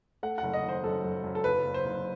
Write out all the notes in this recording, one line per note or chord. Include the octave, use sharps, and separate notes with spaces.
A3 F#5
F#5
F#1
D#5
D#3 C5
F#2 A4
F#2
F#2
A4
F#1 B4
F#1
C5
F#1